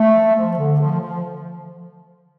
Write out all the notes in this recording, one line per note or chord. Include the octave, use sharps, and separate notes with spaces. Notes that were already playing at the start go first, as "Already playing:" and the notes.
Already playing: A3
F3
F3
D3
F3
F3